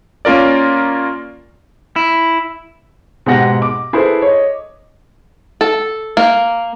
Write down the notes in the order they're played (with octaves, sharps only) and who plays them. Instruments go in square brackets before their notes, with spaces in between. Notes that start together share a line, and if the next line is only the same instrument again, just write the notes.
[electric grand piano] A#3 C#4 F4 A#4 D5
[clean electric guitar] E4
[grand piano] G#2 B2 G4 F#5 A#6
D6
E4 G#4 A4 B4 C5
C#5 D#5
[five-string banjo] A4
A#3